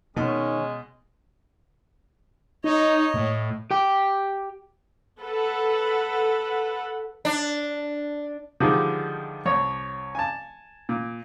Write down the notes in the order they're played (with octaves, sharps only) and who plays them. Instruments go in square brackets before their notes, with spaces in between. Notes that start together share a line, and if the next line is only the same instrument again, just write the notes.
[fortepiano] B2 [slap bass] D#3 [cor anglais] G#3 [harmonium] C#4
[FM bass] D#4 [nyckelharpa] C#5 D#5
[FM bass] A2
[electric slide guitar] G4 G5
[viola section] A4 B4 F#5
[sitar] D4
[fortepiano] D3 D#3 F3 G3 G#3
C2 C#5
G#5 A5
A#2